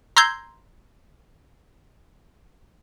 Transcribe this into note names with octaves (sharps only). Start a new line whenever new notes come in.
A#5 C6 E6 G6 G#6